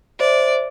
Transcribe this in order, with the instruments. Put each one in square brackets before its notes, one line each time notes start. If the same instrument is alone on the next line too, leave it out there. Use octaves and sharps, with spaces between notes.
[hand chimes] C5 E5 [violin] D5